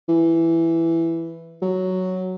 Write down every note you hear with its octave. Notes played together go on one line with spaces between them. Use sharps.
E3
F#3